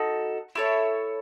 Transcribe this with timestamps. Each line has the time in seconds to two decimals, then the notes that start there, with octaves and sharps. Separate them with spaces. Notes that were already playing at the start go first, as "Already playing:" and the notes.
Already playing: D#4 F#4 A4
0.55 E4 A4 C#5